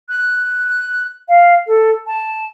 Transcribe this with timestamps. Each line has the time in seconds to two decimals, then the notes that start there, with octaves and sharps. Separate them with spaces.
0.09 F#6
1.29 F5
1.67 A4
2.07 A5